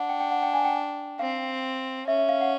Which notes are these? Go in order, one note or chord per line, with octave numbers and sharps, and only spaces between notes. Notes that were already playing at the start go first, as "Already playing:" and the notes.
Already playing: D4 F#5
G5
G5
F#5
G5
G#5
G5
C4 F5
C#4 E5
E5
F5
F#5